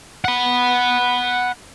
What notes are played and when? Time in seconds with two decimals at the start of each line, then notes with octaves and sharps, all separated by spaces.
0.25 F#5 B5